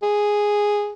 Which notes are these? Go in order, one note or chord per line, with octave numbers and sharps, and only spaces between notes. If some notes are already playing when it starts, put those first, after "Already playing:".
G#4